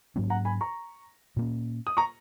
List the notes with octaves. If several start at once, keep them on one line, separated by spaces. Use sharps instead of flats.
G#2 F#3 A#3 C#4
F#5 A#5
G#5 B5
A#5 C#6
A#2 A#3 C#4
D#6
A#5 C#6